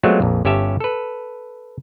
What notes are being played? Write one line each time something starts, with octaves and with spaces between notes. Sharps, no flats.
F#3 G#3 A3 B3 C4 F4
A#1 F2
G1 C#4 G4 E5 A5
A4 B4